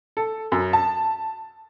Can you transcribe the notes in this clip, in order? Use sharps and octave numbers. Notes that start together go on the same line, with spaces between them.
A4
F#2
A5